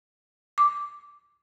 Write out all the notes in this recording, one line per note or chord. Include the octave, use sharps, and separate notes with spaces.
D6